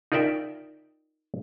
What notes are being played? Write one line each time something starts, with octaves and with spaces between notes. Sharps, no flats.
D#4 F4 A#4 D5 E5 G5